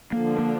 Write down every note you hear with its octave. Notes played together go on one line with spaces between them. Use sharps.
D3 F3 A#3 D4
A#3